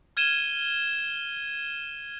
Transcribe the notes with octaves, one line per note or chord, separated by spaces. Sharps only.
F6 G#6 D#7 E7 G7